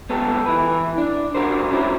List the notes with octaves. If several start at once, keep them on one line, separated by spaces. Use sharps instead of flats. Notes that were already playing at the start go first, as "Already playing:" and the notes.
C#2 B3 G4 A4
E3 B4
D4
D4 F#4 A#4 C5
C#4 E4 F#4 C5 C#5